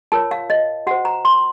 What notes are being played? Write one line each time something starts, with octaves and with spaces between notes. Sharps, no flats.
F4 A#4 C#5 A5
F5
D#5
F#4 C5 F#5
A#5
C6